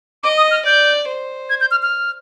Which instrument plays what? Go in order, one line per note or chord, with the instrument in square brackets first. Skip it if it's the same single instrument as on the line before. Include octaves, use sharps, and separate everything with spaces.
[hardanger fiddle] D#5 [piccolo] D6
[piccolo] D#6
F6
[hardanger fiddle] D5 [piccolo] G6
[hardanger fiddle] C5
[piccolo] G#6
G6
F6
F6